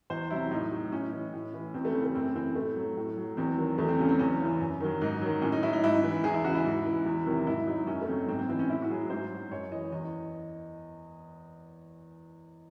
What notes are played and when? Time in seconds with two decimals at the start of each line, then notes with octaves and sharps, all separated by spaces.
0.10 E2 C5
0.30 C3 F#3 E4
0.51 A2 D#4
0.71 F#3
0.92 A2 C#4
1.12 E3
1.33 A2
1.54 E3
1.74 E2 C4
1.85 A3
1.90 C#4
1.94 C#3 E3 C4
2.05 A3
2.15 F#2 C4
2.36 E3 C4
2.55 A2 A3
2.76 F#3
2.97 A2
3.17 F#3
3.37 E2 C4
3.58 D#3 F#3
3.78 E2 A3
3.88 C4
3.99 C#3 F#3 C#4
4.09 C4
4.19 E2 C#4
4.40 C#3 E3
4.60 F#2
4.80 D#3 F#3
5.01 G#2 D#4
5.21 D#3 F#3
5.42 A2 C#4
5.52 D#4
5.62 F#3 E4
5.73 D#4
5.84 G#2 E4
6.03 E3
6.24 E2 G#4
6.34 E4
6.44 C#3 E3 F#4
6.55 E4
6.64 G#2
6.86 E3
7.06 E2
7.26 C3 D#3 F#3
7.47 G#2 E4
7.67 F#3 D#4
7.87 F#2 C#4
8.01 A3
8.08 C#3 F#3 C4
8.28 G#2 C4
8.39 C4
8.49 E3 C4
8.59 C#4
8.69 A2 E4
8.82 F#4
8.90 F#3 G#4
9.10 G#2 C5
9.31 F#3
9.51 F#2 C#5
9.72 E3 D#5
9.92 E2 D#5